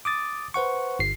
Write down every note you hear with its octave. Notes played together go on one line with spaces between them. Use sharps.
D6 D#6 A6
B4 C5 F#5 C#6
G1 C7